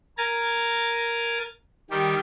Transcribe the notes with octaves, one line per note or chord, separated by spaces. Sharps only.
A#4 G#5 A#5 A6
D#3 G3 G4